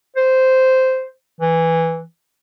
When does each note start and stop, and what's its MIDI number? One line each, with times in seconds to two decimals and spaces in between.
0.16 1.07 72
1.41 2.02 52